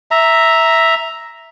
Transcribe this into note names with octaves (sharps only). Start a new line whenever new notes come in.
E5 A#5